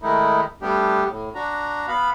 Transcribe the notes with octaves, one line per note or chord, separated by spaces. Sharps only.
D#3 G#3 A3 D#4 E4
G3 A3 B3 D4 G4
A2
D4 F#4 A#5
B3 F5 B5